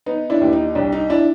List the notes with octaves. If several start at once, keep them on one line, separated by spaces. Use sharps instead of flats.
B3 D#4
D4 E4
D#2
D#4
C2 D4
D#4
D4 E4